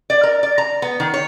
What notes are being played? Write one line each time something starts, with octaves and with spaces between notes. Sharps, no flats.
D5
A#4
D5
A#5
B3
D#3
C#5